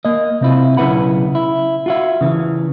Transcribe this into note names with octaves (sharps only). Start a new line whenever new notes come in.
A#3 D#5
C3 C4 E4 F4
B1 C#3 E4 B4 F#5 B5
E4
F4 F#4 E5
C#3 E3